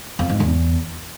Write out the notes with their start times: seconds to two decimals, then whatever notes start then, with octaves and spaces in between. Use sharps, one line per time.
0.19 F2
0.29 G#2
0.40 E2